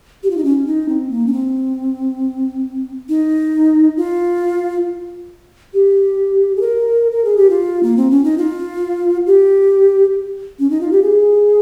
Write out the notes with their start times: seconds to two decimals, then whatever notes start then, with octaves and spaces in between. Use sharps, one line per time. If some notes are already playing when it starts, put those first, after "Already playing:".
0.23 G4
0.30 F4
0.37 D#4
0.45 C#4
0.67 D#4
0.89 C4
1.11 A#3
1.27 C#4
1.33 C4
3.09 D#4
3.97 F4
5.74 G4
6.56 G#4
6.61 A#4
7.12 A#4
7.25 G#4
7.37 G4
7.50 F4
7.83 A#3
7.97 C4
8.11 C#4
8.24 D#4
8.38 F4
9.26 G4
10.59 C#4
10.70 D#4
10.81 F4
10.92 G4
11.03 G#4